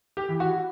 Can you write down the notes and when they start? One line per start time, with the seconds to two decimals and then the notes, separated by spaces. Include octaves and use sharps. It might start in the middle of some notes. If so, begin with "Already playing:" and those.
0.17 G4
0.29 E3
0.40 F#4